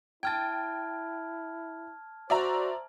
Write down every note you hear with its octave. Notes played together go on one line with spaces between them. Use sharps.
E4 G5 A5 F6 G#6 A6
F#4 C5 D5 E5 A#5